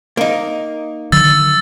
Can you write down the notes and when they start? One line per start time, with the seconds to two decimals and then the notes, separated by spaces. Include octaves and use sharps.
0.17 A#3 D#4
1.12 D3 D#3 F#3 E6 A6